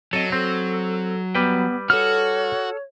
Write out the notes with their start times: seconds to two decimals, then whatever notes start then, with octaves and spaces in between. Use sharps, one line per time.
0.13 F#3 C4 A4 D#5
0.32 C4 A4
1.35 G3 B3 B4 G5
1.90 F#4 A4 C#5 F6